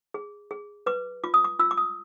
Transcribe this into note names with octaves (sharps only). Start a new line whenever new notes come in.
G#4
G#4
B4 D6
F4 D6
D#6
D6
F4 E6
D6
D#6